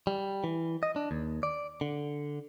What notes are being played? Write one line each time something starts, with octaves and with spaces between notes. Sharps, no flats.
G3
E3
D#5
D4
D#2
D5
D3